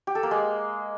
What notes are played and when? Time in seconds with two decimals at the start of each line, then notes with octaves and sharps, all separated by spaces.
0.07 G4
0.15 A4
0.23 A#3
0.31 G#3